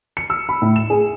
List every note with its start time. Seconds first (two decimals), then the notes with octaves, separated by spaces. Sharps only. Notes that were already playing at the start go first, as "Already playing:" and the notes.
0.17 C#7
0.30 E6
0.49 B5
0.62 A2
0.76 E7
0.90 G#4